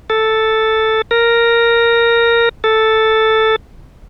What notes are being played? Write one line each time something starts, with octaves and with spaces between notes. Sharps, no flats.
A4
A#4
A4